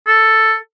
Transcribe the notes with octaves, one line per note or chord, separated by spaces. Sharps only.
A4